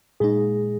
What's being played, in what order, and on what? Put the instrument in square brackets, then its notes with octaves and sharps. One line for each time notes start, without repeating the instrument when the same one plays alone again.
[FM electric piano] A#2 G#3 D#4 [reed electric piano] G#4